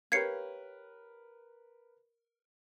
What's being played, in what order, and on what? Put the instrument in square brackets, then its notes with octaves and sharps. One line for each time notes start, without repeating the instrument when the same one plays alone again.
[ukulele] G4 C#5 F5 [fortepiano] A#4 B4 [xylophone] G#6 C7 C#7